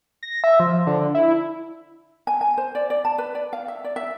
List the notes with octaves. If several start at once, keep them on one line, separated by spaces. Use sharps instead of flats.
A#6
E5
F3
D3
E4
G#5
G#5
C5
D5
D5
A5
B4
D5
F5
E5
D5
E5